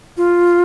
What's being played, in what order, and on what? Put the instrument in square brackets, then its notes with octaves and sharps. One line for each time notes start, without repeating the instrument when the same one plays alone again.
[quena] F4